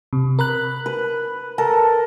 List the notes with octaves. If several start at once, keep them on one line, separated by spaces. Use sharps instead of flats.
C3
A#4 B5 F#6
B4
A4 A#4 A5